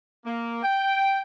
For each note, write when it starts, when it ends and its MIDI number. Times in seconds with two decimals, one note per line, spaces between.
0.25 0.60 58
0.63 1.21 79